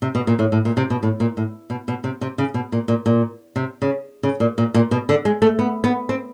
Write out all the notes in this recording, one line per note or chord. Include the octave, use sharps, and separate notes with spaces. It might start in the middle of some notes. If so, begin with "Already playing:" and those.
C3
B2
A#2
A2
A2
A#2
C3
B2
A2
A#2
A2
B2
B2
C3
C3
C#3
B2
A#2
A#2
A#2
C3
C#3
C#3
A#2
A#2
A#2
B2
D3
G#3
A3
B3
B3
C4